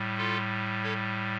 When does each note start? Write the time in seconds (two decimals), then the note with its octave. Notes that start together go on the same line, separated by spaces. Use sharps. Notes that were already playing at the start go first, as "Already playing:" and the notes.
Already playing: A2 G3
0.18 F4 A4
0.83 A4 C#5